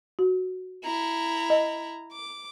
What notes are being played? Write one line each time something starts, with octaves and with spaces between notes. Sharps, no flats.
F#4
E4 A#5
D#5
D6